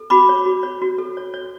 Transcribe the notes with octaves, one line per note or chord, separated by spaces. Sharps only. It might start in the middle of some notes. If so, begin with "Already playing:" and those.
Already playing: A4
F#4 B5 D6
C#5
F#4
C#5
F#4
A4
C#5
C#5